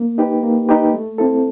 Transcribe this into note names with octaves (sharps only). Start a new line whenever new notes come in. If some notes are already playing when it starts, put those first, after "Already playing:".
Already playing: A#3
D#4 G4 B4
A#3
D#4 G4 B4
A3
C4 E4 A4